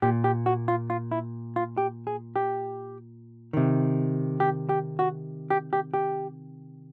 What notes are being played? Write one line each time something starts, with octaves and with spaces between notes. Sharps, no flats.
A#2 G4
G4
F#4
F4
F4
E4
F4
G4
G#4
G4
C3 D#3
G4
G4
F#4
G4
G4
G4